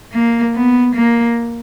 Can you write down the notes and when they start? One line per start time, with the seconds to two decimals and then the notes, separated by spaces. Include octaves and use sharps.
0.13 A#3
0.54 B3
0.95 A#3